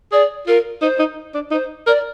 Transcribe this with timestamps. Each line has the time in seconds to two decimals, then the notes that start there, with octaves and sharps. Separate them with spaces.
0.12 G#4 D5
0.47 F4 A#4
0.81 D#4 C5
0.99 D#4
1.34 D4
1.51 D#4 C5
1.87 A#4 D5